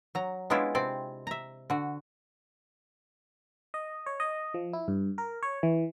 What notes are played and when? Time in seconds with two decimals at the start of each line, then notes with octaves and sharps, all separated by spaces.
0.15 F#3 A#5
0.50 G#3 B3 C#4 D4 E4 F4
0.75 C3 C4 D5
1.27 E5 A#5
1.70 D3 F#4
3.74 D#5
4.06 C#5
4.20 D#5
4.54 F3
4.73 E4
4.88 G2
5.18 A#4
5.43 C#5
5.63 E3